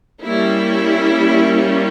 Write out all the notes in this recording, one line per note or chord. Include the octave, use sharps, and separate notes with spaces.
G3 A#3 C#4 E4